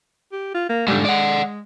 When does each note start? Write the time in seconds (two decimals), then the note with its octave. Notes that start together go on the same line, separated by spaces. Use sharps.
0.32 G4
0.54 F4
0.69 A#3
0.88 G#2 D3 G3
1.05 G#3 D5 F#5